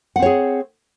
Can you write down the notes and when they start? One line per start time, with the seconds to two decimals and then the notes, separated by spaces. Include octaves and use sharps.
0.16 F#5
0.19 C4
0.22 C#5
0.26 G#4